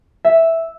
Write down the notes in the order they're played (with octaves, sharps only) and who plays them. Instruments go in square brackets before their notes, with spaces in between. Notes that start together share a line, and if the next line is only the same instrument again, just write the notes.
[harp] E5